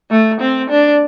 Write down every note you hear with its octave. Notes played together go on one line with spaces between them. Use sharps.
A3
C4
D4